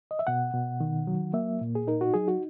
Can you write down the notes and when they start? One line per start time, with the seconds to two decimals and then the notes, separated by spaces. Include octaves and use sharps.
0.11 D#5
0.19 E5
0.27 B2 F#5
0.54 B2
0.80 D#3
1.07 F#3
1.33 A#3 E5
1.61 A#2
1.75 G#4
1.88 D#4 A#4
2.01 F#4
2.14 F#3 G#4
2.28 F#4